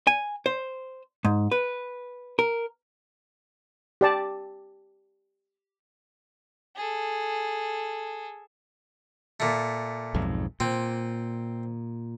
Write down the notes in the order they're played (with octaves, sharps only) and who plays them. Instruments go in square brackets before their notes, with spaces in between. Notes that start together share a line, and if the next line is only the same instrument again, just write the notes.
[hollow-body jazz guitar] G#5
C5
G#2
B4
A#4
[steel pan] G4 D5 A5
[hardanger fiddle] G#4 A4
[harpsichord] A#2 A3
[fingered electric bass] B1 F2 G#2
[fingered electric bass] A#2 [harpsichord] C4